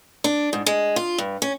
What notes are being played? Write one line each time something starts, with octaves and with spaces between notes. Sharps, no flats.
D4
G#2
G#3
F4
G2
C#4